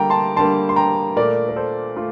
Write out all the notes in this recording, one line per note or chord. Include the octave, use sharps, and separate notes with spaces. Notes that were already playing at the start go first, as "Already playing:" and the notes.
Already playing: D3 G3 A#3 G5 A#5
A5 C6
D3 G3 A#3 A5 C6
C6
G5 A#5
A#2 A3 A#4 D5
A#4
A4 C5
A3 F4